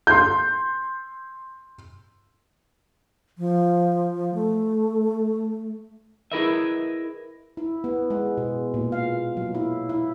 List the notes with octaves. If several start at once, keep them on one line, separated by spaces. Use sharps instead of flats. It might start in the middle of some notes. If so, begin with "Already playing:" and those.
C6 G6
F3
A3
E4 G#4 A#4 B4 D#5 E5
E4
B3
G#3
B2
A#2
F5
F#3
E4
E4